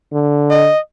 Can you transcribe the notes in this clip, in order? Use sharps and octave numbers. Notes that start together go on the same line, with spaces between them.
D3
D#5